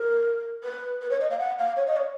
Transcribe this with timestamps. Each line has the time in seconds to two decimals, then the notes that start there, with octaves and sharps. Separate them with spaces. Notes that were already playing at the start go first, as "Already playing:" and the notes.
Already playing: A#4
0.64 B4
1.01 B4
1.10 C#5
1.21 D#5
1.31 F5
1.39 F#5
1.59 F5
1.77 C#5
1.87 D#5
1.97 C#5